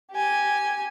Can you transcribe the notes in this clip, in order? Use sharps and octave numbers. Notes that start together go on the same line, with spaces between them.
G4 G#5